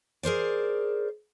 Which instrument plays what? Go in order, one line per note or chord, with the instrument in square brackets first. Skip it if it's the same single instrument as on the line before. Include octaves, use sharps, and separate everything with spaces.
[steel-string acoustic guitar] G#4 A#4 C5 D5